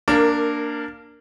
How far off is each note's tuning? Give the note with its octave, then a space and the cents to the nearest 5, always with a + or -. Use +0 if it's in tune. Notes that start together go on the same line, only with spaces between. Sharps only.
A#3 +0 D4 +0 A#4 -20